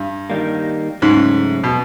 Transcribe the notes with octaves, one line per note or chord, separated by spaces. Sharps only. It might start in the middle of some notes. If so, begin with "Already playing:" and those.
Already playing: G2
D#3 G3 A#3
G#2 C#3 F#3 A3 C#4
B2